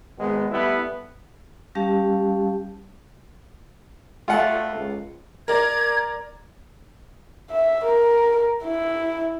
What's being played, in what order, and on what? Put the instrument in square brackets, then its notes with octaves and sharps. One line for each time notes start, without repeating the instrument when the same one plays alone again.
[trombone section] G#1 G#3 B3
G3 A3 B3 E4
[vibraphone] G3 C#4 G4 F5 A5
[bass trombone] A3 [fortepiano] F4 F#5
[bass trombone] C#2
[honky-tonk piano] A#4 D5 [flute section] G#6
[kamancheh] E5
A#4
E4